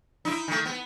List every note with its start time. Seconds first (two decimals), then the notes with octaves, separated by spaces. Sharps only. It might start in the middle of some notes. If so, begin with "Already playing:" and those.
0.25 D#4 E4
0.48 D#3 A3
0.66 B3